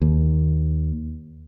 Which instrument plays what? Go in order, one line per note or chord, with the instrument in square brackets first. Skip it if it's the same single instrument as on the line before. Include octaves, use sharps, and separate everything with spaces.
[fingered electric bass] D#2